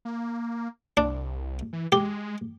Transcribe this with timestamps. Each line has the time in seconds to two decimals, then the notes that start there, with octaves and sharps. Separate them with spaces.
0.05 A#3
0.97 C2 D4
1.73 E3
1.92 G#3 G4